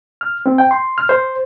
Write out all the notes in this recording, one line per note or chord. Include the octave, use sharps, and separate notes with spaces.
F6
C4
G5
C6
F6
C5